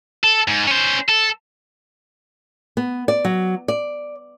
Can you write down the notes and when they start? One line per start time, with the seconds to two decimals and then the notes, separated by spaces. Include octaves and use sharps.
0.24 A4
0.48 G#2
0.67 C#4 C5
1.09 A4
2.77 B3
3.08 D5
3.25 F#3
3.68 D5